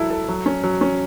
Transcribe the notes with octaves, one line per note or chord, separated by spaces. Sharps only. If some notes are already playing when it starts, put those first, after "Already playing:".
Already playing: F#3 E4 A4
A4
F#3
C#4
F#3
C#4